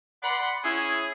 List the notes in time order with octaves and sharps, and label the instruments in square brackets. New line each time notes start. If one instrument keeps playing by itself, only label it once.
[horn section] D5 B5 C6 [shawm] F#5
[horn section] C#4 E4 G#5 [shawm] G#4